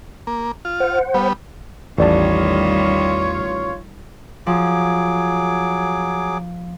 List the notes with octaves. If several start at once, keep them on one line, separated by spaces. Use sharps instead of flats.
A#3
F4
C5 F#5
G3 B3
A1 E2 D#3 G3 F4 C#5 D5 A5
F3 F#3 G#4 D6